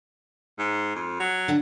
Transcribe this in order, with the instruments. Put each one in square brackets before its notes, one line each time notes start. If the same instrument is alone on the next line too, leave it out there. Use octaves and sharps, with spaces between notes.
[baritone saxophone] G#2
F2
F#3
[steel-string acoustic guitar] D3 D4 F#5